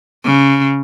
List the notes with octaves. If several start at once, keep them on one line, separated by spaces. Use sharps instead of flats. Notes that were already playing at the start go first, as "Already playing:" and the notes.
C#3